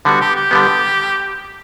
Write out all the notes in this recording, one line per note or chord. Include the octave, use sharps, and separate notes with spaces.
D3 G3 B3 F#4
G4
G4
D3 G3 B3